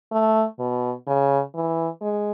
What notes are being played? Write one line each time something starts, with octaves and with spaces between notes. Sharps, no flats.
A3
B2
C#3
E3
G#3